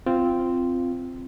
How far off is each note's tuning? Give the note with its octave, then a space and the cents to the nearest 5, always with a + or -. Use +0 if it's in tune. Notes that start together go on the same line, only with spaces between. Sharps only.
C4 -5 F4 -10